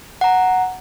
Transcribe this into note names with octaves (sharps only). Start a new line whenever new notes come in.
F#5 A#5